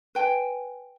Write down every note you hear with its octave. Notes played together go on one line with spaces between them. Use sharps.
B4 G5 G#5